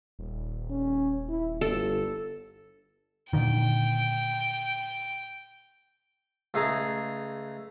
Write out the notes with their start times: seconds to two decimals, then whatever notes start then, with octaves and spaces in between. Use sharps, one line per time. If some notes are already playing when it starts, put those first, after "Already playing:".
0.19 D#1
0.70 C#4
1.28 E4
1.61 G1 A4
3.33 A#2 D3 D#3 G5
6.54 C#2 A3 G#4 A#5